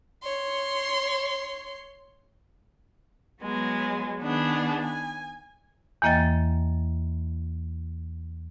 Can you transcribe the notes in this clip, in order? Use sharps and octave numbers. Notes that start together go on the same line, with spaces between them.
C#5 C6
F#3 G#3 B3
D#3 B3 D4 G#4
G#5
E2 E3 A#3 D#5 G5 A6